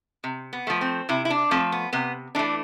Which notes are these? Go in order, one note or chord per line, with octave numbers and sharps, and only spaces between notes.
C3
B3
F3 A3
C4
C3 E4
E4
D4
F3 A3 C4
B3
C3 B3
E3 A3 D4